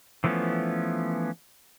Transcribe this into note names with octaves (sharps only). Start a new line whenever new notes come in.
E3 F3 A3 B3 C#4